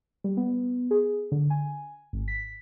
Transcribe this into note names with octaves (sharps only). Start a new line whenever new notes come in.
G3
B3
G#4
D3
G#5
G#1
B6